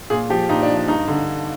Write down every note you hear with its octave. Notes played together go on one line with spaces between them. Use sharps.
A#2 G#4
F3 G4
A#2 D#4
D4
F3
D4
G2 D#4
D3